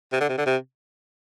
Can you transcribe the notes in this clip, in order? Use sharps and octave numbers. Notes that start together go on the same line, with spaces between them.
C3
D3
C3
D3
C3